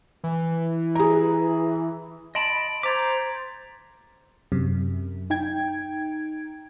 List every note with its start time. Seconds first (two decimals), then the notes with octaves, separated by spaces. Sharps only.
0.24 E3
0.95 G#4 A#5
2.35 D#5 A5 B5 C6 D7 F#7
2.83 C5 A#5 D6 G#6 A6 B6
4.52 F#2 C3
5.30 D#4 G5 G#6